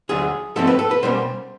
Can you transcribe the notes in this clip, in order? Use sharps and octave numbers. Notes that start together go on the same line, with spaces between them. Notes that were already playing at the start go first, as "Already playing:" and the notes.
D2 D3 F#3 G#4
G#2 F3 A3 C4 A4
B4
A4
B4
B2 G3 A#3 C#4 C5